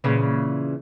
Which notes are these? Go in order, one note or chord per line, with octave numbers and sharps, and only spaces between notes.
A#2 C#3 E3